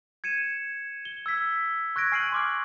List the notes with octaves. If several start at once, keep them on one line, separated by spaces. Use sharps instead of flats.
G#6 C#7 D#7 E7
G7
E6 G#6 B6
C#6 F#6 G#6 A#6 D7
G#5 F6 C7 D7 D#7 F#7
C6 D6 F6